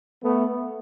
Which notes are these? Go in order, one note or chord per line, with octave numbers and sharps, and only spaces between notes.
A3 B3